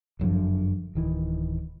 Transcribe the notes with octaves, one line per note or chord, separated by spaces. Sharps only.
G1 F#2 D3 F3
D1 D#3 E3